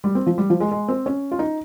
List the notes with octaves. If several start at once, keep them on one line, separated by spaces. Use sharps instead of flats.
G3
C4
F3
G3
F3
G#3
G#3
C4
C#4
F4
D#4